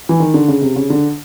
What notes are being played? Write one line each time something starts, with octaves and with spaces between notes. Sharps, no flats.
E3
D#3
D3
C#3
C3
C#3
D3